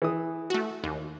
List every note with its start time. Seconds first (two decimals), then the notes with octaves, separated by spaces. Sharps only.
0.02 E3 D#6
0.50 A3 F#4
0.84 D#2